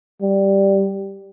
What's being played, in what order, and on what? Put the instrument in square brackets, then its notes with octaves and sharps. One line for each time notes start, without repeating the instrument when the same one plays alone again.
[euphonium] G3